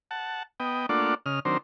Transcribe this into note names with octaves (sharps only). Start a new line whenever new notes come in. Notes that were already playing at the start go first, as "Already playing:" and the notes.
F#5 A5
B3 D#5 G5
A3 A#3 D4 F4 D5 F#5
C#3 D#5 F6
D#3 F#3 C4 D4 A#4 C5